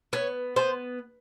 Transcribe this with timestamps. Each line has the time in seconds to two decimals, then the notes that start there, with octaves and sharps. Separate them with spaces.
0.13 B3 C#5
0.56 B3 C5